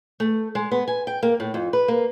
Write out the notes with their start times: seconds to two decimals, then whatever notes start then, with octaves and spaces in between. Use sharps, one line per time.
0.20 A3
0.55 G#3
0.71 B3
0.88 G#5
1.07 G5
1.23 A#3
1.40 A2
1.54 F2
1.73 B4
1.88 A#3